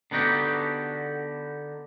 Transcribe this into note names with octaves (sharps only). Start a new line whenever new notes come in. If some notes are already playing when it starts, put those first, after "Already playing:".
D3 B3 D#4 F#4 G4